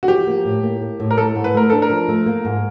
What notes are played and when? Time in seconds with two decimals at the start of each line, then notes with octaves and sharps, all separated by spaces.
0.03 F#4
0.07 F3 G4
0.27 A#3
0.45 A2
0.63 A#3
0.82 A#3
1.00 A2
1.11 A#4
1.17 A3 A4
1.35 G#2
1.44 B4
1.54 A3 A#4
1.70 D4 A4
1.82 A#4
1.90 F3
2.08 A3
2.26 A#3
2.45 G#2